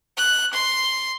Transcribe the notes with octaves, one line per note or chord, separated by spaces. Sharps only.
F#6
C6